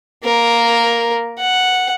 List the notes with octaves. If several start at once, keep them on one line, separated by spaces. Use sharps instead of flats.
A#3 A#4
F#5